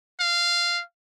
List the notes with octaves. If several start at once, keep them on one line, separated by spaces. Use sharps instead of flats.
F5